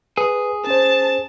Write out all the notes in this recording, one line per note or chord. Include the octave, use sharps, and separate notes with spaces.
G#4 B4
C#4 C5 A5